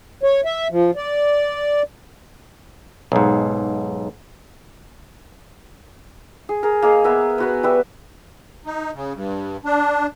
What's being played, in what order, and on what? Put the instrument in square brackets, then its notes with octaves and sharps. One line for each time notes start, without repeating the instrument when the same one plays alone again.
[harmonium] C#5
E5
F3
D5
[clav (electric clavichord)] B1 G#2
[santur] G#4
G#4 A#4
A#3 G#4 D#5 F5
B3 A#4 E5
B3 F#4 B4
G3 B4 E5
[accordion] D#4
C#3
G2
D4